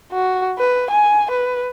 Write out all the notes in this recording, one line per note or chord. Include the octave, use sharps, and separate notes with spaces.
F#4
B4
G#5
B4